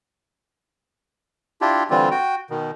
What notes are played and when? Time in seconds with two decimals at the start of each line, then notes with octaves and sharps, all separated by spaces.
1.61 D4 E4 F4 G4
1.90 D3 E3 G3 C4 F4
2.11 F#4 G5
2.50 B2 D#3